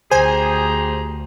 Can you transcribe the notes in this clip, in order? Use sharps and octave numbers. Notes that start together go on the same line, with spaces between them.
D2 G4 G#4 C5 G#5 A#5